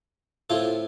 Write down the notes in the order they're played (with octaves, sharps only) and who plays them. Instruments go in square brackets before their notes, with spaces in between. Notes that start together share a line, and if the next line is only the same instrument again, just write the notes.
[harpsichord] A2 A3 C4 F4 A4